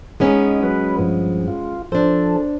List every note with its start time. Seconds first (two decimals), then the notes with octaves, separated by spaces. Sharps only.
0.20 G#3 B3 C#4 D#4
0.63 F#3 B4
0.99 G2 F3
1.48 F4
1.92 F3 D4 A4 C5